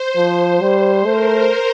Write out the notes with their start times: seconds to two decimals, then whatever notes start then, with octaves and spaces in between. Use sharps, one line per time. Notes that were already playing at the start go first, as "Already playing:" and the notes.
Already playing: C5
0.16 F3
0.60 G3 C5
1.06 A3 A#4